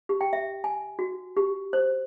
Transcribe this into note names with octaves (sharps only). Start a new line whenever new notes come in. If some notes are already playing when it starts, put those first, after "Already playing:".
G4
G5
E5
G#5
F#4
G4
C5